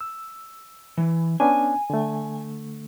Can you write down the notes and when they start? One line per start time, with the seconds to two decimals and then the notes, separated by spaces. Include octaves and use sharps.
0.01 E6
0.98 E3
1.40 B3 C#4 D4 G#5
1.90 D3 A3